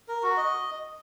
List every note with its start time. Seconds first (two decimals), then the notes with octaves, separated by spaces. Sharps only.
0.08 A#4
0.23 F#4
0.37 D#5